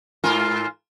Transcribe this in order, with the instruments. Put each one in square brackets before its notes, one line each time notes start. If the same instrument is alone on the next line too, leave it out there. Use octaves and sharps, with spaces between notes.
[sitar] G#2 F4 A#4